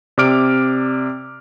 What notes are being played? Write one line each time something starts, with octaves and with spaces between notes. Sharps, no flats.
C3 D5 D6 F6 D7